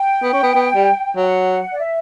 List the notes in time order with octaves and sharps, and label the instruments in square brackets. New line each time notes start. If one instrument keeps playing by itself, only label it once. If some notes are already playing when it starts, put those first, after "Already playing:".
Already playing: [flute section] G5
[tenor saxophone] B3
C#4
B3
B3
G3
[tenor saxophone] F#3 [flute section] F#5
[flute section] D5
E5